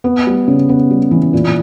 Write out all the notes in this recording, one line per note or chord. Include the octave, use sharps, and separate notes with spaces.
B3
G3
C#3
B3
G3
E3
A#2